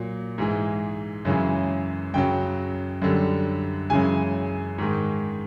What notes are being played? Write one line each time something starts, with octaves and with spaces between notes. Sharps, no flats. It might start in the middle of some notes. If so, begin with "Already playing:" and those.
Already playing: A#2 F#3
G#2 E3 G#3
F#2 C#3 E3 G#3
F#2 C#3 F#3 G5
F#2 D3 G3
F#2 C#3 E3 G#3 G#5
G#2 D#3 G#3